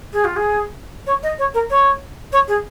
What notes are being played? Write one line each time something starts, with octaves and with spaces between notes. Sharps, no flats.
G#4
F4
G#4
C#5
D#5
C#5
A#4
C#5
C#5
G#4